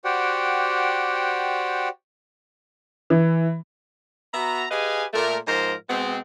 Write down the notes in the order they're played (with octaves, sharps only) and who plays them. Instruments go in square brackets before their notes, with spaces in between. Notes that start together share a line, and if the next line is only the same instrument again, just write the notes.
[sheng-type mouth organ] F#4 G4 C5 D5 F#5 G5
[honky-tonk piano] E3
[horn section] B3 F#4 E5 A#5
G4 G#4 B4 D#5 F5 G#5
A#2 A3 A#4
G#2 F3 A#4 C5
B2 G#3 B3 C4